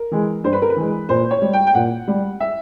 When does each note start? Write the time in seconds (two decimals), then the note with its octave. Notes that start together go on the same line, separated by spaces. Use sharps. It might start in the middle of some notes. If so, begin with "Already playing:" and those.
Already playing: A#4
0.12 E3 G#3
0.44 G2 C5
0.53 B4
0.62 A#4
0.70 B4
0.76 E3 G#3
1.09 A#2 C5
1.31 C#5
1.42 G3
1.53 G5
1.67 G5
1.75 A#2 F#5
2.08 G3
2.40 E5